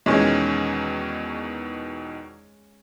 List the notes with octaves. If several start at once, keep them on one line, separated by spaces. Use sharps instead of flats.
E2 B2 D#3 G#3 C#4